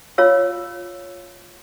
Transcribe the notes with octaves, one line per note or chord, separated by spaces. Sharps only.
F4 C#5 F5 E6